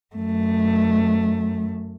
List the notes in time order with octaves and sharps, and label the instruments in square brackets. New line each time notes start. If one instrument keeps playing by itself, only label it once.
[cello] F#2 A3